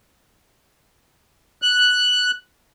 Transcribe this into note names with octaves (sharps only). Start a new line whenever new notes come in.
F#6